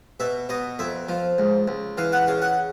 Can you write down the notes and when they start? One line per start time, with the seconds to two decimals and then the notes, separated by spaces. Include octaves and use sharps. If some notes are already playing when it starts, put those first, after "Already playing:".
0.20 B2 E5
0.49 B2 D#5
0.79 F2 E5
1.09 F3
1.38 C#2
1.68 C#2
1.98 E3 F5
2.13 F#5
2.27 C#3 F5
2.42 F#5